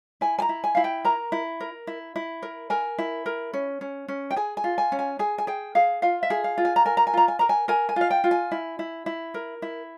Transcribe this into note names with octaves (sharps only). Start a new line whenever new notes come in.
E4 G#5
G#5
A#5
E4
G#5
E4 F5
G5
A#4 A#5
E4
A#4
E4
E4
A#4
A#4 G#5
E4
A#4
C#4
C#4
C#4
G5
G#4 G#5
G#5
F4
G#5
C#4
G#5
G#4 G#5
G#5
G#4 G5
G#4 F5
F4 F5
E5
G#4
F5
F4
G#5
A#5
A#4 G#5
A#5
G#5
F4 A#5
G#5
A#4 A#5
G#5
A#4 G#5
G#5
F4 F5
G5
F4
G#5
E4
E4
E4
A#4
E4